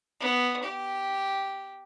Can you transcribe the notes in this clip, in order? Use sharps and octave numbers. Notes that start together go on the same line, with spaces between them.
B3
G4